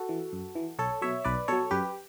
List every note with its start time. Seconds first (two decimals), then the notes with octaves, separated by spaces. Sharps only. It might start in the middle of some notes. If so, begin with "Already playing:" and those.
Already playing: F#4 A4
0.09 E3
0.32 F#2
0.55 E3
0.78 B1 A4 C#5
1.02 B2 F#3 C#5 E5
1.24 B1 B4 D5
1.48 B2 F#3 A4 C#5
1.71 F#2 G4 B4